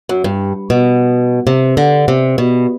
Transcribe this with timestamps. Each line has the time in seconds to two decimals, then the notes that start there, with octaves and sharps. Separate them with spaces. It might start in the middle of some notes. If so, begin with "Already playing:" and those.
0.09 F#2
0.24 G2
0.70 B2
1.47 C3
1.77 D3
2.08 C3
2.38 B2